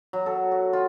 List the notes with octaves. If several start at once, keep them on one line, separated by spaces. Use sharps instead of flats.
F#3
A4
F#4
F4